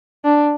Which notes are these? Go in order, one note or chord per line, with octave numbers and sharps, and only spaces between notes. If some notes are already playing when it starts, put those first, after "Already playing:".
D4